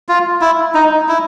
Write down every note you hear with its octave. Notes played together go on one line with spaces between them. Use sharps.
F4
E4
D#4
E4